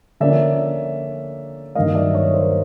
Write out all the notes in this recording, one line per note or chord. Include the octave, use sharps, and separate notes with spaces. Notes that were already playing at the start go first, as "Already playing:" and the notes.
D3 F3 A#3 C#4 D5 E5
G2 D#3 F#3 A#3 D#5 F5
D5 E5
C#5 D#5
A#4 C5